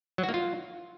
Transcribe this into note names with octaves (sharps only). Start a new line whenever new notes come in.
F#3
F#4
A#3
F4